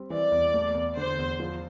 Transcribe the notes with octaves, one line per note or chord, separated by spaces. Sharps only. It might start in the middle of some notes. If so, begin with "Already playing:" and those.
Already playing: G3 C4
E3 D5
E2
A3
E2
D3 C5
E2
F3